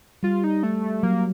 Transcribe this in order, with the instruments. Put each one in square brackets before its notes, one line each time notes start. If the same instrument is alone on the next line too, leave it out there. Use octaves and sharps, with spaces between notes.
[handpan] G3 [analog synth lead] F4
[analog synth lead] D#4
A3
[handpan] F#3 [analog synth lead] A#3